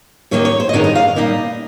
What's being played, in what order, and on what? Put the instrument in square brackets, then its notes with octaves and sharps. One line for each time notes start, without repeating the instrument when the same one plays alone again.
[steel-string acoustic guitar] D#2 D#3 A#3 D#4 C#5
C#5
C5
D#5
G2 D#3 G#3 D#4 C#5
D#5
F5
A#2 G3 A#3 D#4 D#5